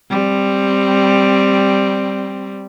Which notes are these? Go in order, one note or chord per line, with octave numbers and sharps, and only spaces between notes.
G3 C4